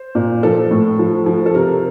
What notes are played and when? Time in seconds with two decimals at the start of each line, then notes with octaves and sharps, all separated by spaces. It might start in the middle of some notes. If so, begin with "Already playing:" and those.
Already playing: C5
0.15 A#2
0.43 F3 A4
0.71 A2
0.99 F3
1.26 F3
1.46 A4
1.54 C3 A#4